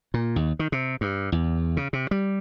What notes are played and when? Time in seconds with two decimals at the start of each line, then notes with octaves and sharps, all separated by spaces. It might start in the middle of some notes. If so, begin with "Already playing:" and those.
0.14 A#2
0.36 D#2
0.59 D#3
0.72 C3
1.01 G2
1.32 E2
1.77 C#3
1.93 C3
2.11 G3